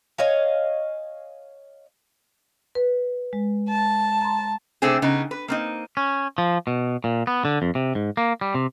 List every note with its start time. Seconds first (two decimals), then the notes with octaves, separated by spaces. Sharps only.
0.18 C#5 D#5 F5 G#5
2.75 B4
3.33 G#3
3.68 A5
4.21 A#5 C6
4.82 C3 A3 C4 D4 G#4
5.02 C#3 B3 D#4
5.31 B4
5.48 A#3 C4 D#4
5.97 C#4
6.38 F3
6.67 B2
7.04 A#2
7.27 B3
7.45 D3
7.62 F2
7.75 C3
7.95 G#2
8.17 A#3
8.41 G3
8.54 C3